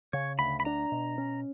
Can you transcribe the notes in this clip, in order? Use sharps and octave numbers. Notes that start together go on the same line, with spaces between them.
C#3 C#5
D2 B5
B5
D4 A#5
B2
C#4